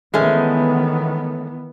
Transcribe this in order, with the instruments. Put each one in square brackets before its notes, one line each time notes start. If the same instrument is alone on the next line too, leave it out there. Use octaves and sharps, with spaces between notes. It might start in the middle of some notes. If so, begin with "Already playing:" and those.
[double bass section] D#3 E3 B3 [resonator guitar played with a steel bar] G#3 A3 C#4